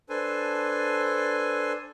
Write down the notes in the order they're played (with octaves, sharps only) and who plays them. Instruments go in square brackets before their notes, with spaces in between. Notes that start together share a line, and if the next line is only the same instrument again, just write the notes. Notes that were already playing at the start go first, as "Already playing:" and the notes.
[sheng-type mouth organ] D4 A4 B4 C5 G#5